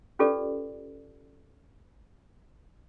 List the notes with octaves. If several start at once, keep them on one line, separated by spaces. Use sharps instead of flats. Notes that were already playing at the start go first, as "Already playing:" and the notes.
C#4 F4 G4 A4 B4 D5